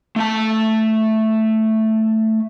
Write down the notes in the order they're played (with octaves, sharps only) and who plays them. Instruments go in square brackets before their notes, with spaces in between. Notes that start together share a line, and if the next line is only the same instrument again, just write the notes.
[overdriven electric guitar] A3 A5